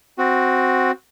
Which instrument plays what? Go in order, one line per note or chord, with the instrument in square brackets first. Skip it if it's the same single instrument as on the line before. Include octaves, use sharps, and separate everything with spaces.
[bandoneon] C4 F#4